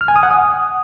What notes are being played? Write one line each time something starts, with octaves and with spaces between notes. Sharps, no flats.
F6
G#5
D#6
F#5
D#6